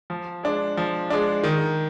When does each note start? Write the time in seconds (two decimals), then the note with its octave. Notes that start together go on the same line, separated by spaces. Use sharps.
0.10 F3
0.43 G#3 D4
0.77 F3
1.10 G#3 D4
1.43 D#3